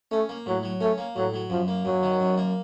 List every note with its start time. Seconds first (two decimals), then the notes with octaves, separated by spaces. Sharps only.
0.11 A3 C#4
0.29 A#3
0.46 A2 F#3
0.63 F#3
0.81 A3 C#4
0.98 A#3
1.16 A2 F#3
1.34 F#3
1.50 F#2 F3
1.68 A#3
1.85 F#2 F#3
2.03 D#3
2.20 F#2
2.38 A#3